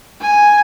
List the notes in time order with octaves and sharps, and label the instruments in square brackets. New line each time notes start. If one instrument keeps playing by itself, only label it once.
[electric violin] G#5